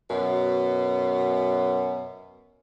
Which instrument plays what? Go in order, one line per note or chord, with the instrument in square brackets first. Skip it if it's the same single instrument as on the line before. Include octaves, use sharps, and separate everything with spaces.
[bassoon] F#2 [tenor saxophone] B2